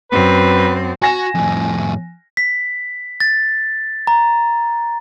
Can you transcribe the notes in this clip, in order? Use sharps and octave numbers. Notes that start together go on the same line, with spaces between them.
F#2 C4 B4
F#4 G#5 A#6 E7
F2 A2
B6
A6
A#5